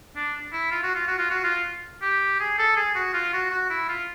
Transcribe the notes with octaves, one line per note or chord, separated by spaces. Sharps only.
D4
E4
F4
F#4
F4
F#4
F4
F#4
F4
G4
G#4
A4
G#4
F#4
F4
F#4
F#4
E4
F4